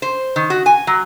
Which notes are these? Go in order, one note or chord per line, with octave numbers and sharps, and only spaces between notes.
C5
D#3
F#4
G#5
F#3